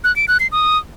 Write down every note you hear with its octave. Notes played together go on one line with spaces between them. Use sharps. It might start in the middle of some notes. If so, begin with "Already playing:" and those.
F#6
D7
F#6
C7
D#6